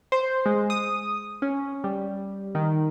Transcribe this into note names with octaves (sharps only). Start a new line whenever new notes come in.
C5
G#3
D#6
C#4
G3
D#3